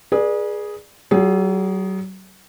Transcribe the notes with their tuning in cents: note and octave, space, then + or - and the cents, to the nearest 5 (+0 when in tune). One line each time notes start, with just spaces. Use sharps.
G#4 +0 B4 -40 D5 +15
F#3 +40 F4 +45 G#4 +0